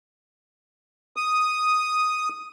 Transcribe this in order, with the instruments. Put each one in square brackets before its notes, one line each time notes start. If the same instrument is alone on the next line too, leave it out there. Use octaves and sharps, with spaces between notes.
[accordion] D#6